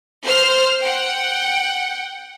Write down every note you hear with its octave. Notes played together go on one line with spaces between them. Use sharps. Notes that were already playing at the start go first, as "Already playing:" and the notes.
C5 F6
F#5 G5